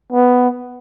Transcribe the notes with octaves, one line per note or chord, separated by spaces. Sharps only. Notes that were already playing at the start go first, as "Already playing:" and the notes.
B3